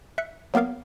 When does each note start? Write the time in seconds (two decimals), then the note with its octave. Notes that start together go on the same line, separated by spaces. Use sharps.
0.18 E5 F#6 C#7
0.54 F#3 A#3 B3 A#4 F5